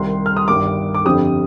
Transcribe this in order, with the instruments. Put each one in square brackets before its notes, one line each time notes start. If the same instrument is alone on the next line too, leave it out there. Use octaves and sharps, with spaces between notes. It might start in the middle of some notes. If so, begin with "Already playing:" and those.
Already playing: [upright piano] C2 C3 D#3 C6
F6
D#6
G1 G2 D#3 D6
D6
G1 F2 D3 G3 C4 D#6